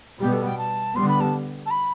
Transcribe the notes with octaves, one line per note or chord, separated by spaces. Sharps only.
B2 G3 B3 G4
A4
G5
A5
D3 G3 B3 C6
B5
A5
A5
B5